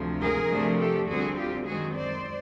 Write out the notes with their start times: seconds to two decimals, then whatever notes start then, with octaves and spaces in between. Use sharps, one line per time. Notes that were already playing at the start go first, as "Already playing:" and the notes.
Already playing: D2 C3 F3
0.21 G#4 A#4
0.50 C3 F3 A3 D4
0.79 G4 A4
1.08 D2 D3 G3 C4 F#4 G#4
1.37 F4 G4
1.66 F#2 D#3 G#3 C4 F#4 G#4
1.95 C5 D5